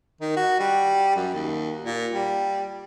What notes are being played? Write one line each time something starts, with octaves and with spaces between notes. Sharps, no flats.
D#3
F#4
G3
F#2
D#2
A#2
G3